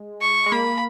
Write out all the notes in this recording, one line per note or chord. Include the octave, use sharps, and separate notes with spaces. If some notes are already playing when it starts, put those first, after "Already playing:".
Already playing: G#3
C#6
G#3
A#3 B5